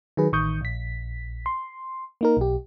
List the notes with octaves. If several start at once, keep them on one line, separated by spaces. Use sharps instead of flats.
D#3 F#3 G#4 B4
A1 D#3 C#6 D#6 G6
A#1 B6
C6
A#3 D#4 A#4
B1 G4